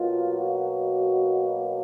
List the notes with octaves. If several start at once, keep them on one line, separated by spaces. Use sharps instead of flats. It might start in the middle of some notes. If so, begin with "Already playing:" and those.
Already playing: B2 F#3 A#3 F4
F#4